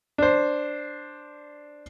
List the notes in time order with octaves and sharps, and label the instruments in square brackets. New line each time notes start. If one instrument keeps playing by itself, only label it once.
[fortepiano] D4 C5